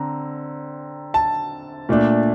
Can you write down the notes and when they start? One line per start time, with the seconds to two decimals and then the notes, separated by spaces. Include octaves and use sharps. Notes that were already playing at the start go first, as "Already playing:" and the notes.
Already playing: D3 C4 A#5
1.14 A5
1.89 A#2 A3 D4